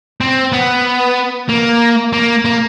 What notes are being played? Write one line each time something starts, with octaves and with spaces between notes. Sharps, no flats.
C4
B3
A#3
A#3
A#3